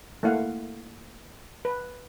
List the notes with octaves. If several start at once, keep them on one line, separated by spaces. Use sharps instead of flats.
A3 A#3 E4 F5 F#5
B4